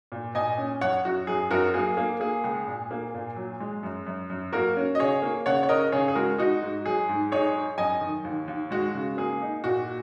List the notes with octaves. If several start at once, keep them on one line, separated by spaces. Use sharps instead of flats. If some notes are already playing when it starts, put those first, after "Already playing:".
A#2
A#2 D#5 G#5
C#4
F#2 C#5 F#5
F#2 F#4
F#2 G#4
F#2 F#4 A#4
A#3 G#4
A#3
A#3 G#4
C#2
A#2
A#3
A#2
F#3
G#3
F#2
F#2
F#2
A#3 F#4 A#4
C#4
D#5
C#3 G#4 C#5
A#3
C#3 C#5 F#5
C#5
C#4 A#4 D#5
C#3 G#4 C#5
G#4
G#3 F#4 A#4
D#4 F#4
G#2
F#3 G#4
G#2
D#4 G#4 C#5
D#4
F#2 D#5 G#5
D#3
D#2
D#2
G#3 F#4
C#3
A#3 G#4
D#4
A#2 F#4